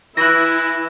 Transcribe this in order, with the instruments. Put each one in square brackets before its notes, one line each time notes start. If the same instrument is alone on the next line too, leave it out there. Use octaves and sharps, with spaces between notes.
[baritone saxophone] E3 [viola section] E4 [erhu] E6 [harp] F#6 A#6